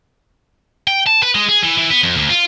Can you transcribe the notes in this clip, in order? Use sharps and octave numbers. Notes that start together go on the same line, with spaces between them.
G5
A5
B4
G#3
G#4
E3
E3
B3
F2
D2
F4